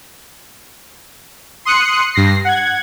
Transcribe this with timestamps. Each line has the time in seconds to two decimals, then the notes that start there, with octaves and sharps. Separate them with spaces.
1.65 C6 D#6 F#6 C#7
2.14 G2 A#6 C7
2.45 F#5 G#6